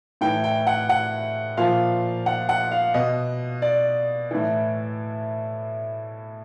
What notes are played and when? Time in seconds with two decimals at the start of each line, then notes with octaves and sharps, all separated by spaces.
0.21 A2 E3 G5
0.44 G5
0.67 F#5
0.89 F#5
1.57 A#2 F3 F5
2.26 F#5
2.49 F#5
2.71 F5
2.94 B2 D#5
3.62 D5
4.31 A2 E3